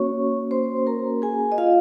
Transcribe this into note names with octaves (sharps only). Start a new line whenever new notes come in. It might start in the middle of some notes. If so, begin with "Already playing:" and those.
Already playing: A#3 C#4 F#4 C#5 C#6
C5 C6
A#4 A#5
G#4 G#5
D#5
F4 F5